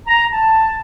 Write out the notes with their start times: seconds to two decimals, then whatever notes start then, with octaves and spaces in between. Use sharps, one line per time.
0.07 A#5
0.33 A5